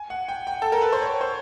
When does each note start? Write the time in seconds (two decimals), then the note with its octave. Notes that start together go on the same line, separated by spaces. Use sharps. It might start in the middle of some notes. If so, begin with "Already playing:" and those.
Already playing: G#5
0.10 F#5
0.28 G5
0.47 G5
0.62 A4
0.72 A#4
0.82 B4
0.93 C5
1.02 C#5
1.21 C5